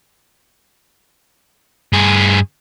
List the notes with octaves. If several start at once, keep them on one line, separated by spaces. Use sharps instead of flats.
G2 G#4